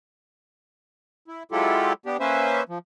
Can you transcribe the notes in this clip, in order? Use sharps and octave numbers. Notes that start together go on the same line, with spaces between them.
E4
F#3 G#3 E4 F4 G4 A4
B3 D4 G4
A#3 C#4 B4 C5 E5
F3